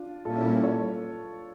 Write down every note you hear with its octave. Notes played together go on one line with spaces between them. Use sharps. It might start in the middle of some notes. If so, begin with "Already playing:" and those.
Already playing: D4 F4
A#2 G3 A#3 C#4 E4 F4 A4
A4 C#5